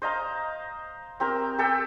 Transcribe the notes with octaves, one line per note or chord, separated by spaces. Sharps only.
C5 D#5 F5 A#5
C4 G4 A#4
G4 A4 G5 E6